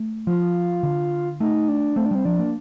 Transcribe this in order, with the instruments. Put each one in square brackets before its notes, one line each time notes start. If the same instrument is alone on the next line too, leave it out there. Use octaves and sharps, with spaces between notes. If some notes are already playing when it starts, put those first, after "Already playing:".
Already playing: [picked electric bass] A3
[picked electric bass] F3 [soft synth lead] F4
[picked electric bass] D3
[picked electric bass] A3 [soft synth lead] D#4
[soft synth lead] D4
[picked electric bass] A3 [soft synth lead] C4
[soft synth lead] D4
[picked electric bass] G3 [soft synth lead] C4
[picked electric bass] F3 [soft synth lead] D4
[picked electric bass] A#3